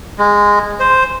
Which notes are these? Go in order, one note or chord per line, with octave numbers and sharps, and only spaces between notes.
G#3
C5